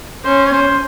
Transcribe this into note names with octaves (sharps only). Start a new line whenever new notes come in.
C#4 C5
C#5
C5